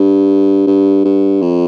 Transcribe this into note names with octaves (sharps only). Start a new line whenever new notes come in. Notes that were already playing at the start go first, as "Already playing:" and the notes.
Already playing: G2
G2
G2
F2